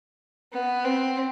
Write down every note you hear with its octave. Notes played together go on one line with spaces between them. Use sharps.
B3
C4